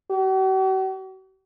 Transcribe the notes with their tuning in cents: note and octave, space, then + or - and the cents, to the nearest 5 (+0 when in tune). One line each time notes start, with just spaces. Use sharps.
F#4 +45